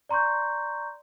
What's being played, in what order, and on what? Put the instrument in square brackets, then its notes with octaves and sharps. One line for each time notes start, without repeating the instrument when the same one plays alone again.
[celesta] D5 A#5 C6 C#6 G6